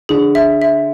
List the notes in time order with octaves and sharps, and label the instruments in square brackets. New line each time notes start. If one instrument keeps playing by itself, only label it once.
[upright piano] D3 [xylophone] G#4
[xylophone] E5
E5